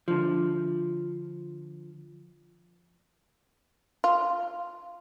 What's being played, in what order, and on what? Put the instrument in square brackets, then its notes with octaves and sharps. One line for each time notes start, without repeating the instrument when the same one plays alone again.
[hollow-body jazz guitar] D3 F3
[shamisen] F4